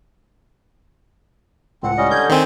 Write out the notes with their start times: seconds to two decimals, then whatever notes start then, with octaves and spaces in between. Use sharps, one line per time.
1.83 C#2 A2 C4 F#5
1.98 G3 C#4 D#5
2.11 D3 G6 G#6
2.29 D#3 C4 G#5